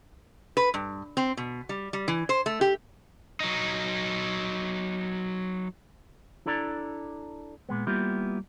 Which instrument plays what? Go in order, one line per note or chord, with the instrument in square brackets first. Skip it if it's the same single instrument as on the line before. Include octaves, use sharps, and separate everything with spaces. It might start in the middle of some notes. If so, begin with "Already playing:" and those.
[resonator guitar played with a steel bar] B4
G2
C4
B2
G3
G3
E3
C5
A3
G4
[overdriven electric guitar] F#3 D#4
[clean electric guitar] D4 E4 A4 D5 A#5
A#2 G#3 B3
G3 A#3 B3 E4 F4 G4